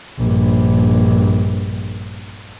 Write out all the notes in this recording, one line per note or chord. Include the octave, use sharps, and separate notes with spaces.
A#1 G2